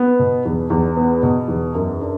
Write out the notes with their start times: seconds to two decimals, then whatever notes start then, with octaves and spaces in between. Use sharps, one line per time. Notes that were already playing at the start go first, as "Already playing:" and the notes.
Already playing: B3
0.19 B2
0.45 E2
0.70 E2
0.97 B3
1.23 B2
1.48 E2
1.75 F#2
2.01 D4